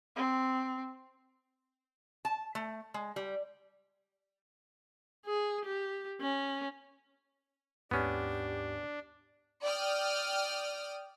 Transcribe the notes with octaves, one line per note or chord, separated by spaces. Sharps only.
C4
A5
A3
G#3
G3
G#4
G4
C#4
D#2 G#2 B3 C#4 D4 G4
D5 G5 D#6 F6